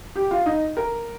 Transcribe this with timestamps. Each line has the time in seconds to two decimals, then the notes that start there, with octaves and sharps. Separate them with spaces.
0.16 G4
0.31 F4
0.46 D#4
0.77 A#4